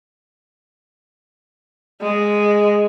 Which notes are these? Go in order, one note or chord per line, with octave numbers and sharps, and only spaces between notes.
G#3